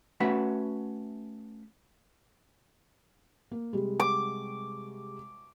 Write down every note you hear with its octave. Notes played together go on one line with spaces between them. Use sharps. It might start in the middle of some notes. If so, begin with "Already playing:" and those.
A3 C#4 F#4 B4 E5 F#5
A#3
C3 G3 G#3
D6